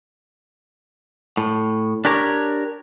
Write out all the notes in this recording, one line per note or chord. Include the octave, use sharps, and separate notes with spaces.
A2
D4 G4 A#4 C#5